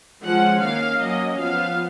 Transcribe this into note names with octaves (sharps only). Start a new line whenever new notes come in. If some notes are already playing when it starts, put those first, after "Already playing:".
F3 G#3 C#4 F#5
D#3 A#3 C#4 F5
F#3 A#3 C#4 D#5
F3 B3 F5